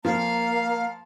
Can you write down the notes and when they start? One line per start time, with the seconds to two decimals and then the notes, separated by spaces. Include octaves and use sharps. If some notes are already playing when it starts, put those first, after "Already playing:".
0.05 F3 A#3 F5 A#5